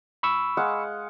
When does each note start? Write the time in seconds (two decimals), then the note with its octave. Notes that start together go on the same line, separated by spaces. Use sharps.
0.23 B5 C#6 E6
0.57 G#3 F5 F#5